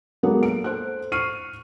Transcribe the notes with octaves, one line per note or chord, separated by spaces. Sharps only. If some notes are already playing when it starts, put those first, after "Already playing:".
F#3 G#3 A#3 B3 A4 A#4
D7
A4 C5 F#6
C#6 F6 C7 D#7